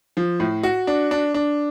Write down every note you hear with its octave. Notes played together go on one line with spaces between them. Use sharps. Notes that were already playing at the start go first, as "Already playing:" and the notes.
F3
A2
F#4
D4
D4
D4